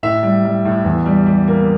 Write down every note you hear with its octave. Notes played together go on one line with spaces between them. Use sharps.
A2 E5
G3
G3
A2
E2
G3
G3
A#3